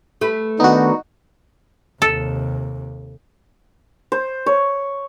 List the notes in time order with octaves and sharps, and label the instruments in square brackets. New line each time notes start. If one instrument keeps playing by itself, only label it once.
[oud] A3 B4
[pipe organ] D#3 D4 [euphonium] B3 [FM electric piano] D#4 F#4
[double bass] D#2 C3 [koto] A4
[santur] C5
C#5